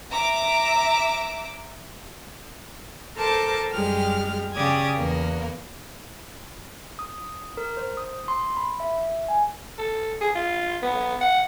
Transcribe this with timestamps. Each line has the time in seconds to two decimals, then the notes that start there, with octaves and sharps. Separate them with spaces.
0.10 E5 A#5 D6
3.16 A4 A#4 C5 A5 D6
3.73 F#2 G3 G#3 G4 F6
4.55 C#3 G4 D5 D#6 G#6
4.97 E2 A#3 B3
6.99 D#6
7.57 A#4
7.77 C5
7.97 D#6
8.28 C6
8.57 B5
8.80 E5
9.28 G#5
9.78 A4
10.21 G#4
10.35 F4
10.82 B3
11.21 F#5